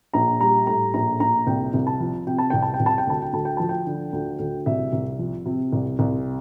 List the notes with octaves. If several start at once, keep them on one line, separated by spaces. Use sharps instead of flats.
A#1 A#5
G3 A#5
A2 A#5
A#1 A#5
A#1 A#5
C2 G5
C2
A5
F3
C3 G5
A5
C2 G5
A5
G5
C2
A5
G5
D2 A5
G5
D2 A5
G5
F3 A5
G5
D3
D2
D2
C2 E5
C2
F3
C3
C2
C2